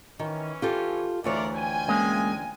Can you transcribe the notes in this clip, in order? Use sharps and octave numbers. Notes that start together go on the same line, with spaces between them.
D#3 E3 C#4
F4 G4 A4
D2 E3 F4 A#4 C#5 D5
F4 G5 G#5
G#3 A#3 C#4